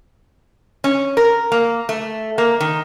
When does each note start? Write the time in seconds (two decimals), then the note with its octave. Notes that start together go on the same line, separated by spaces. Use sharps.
0.84 C#4
1.17 A#4
1.52 A#3
1.89 A3
2.38 A#3
2.60 D#3